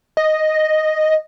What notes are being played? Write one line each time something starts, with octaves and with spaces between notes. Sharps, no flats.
D#5